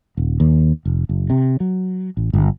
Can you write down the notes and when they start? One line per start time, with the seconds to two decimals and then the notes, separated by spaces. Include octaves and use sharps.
0.17 D#1
0.40 D#2
0.85 F1
1.09 F#1
1.30 C3
1.60 F#3
2.17 A1
2.33 G1